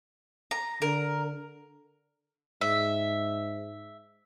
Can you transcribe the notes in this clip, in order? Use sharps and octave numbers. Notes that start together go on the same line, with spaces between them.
A#5
D3 A#4
G#2 E5